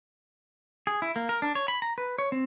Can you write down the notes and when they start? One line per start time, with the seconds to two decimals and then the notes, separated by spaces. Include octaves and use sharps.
0.87 G#4
1.02 E4
1.16 A#3
1.29 A#4
1.42 D4
1.55 C#5
1.68 B5
1.82 A#5
1.98 B4
2.18 C#5
2.32 C4